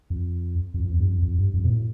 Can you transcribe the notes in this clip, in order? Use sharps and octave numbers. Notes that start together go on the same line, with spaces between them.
F2
F2
F2
E2
G2
F2
F2
G2
F2
B2
A2